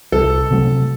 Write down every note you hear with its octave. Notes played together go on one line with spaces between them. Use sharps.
C2 A4
C3 F#3 A3